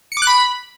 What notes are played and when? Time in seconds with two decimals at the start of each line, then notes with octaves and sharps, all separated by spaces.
0.12 C#7
0.17 D6
0.22 F#6
0.27 B5